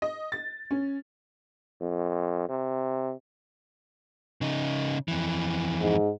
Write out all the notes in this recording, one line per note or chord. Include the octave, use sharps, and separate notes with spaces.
D#5
A6
C#4
F2
C3
C#3 D#4
F2 E3
G#2